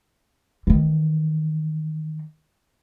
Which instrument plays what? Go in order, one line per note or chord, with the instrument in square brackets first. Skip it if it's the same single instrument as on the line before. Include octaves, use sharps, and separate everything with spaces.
[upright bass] D#3 E3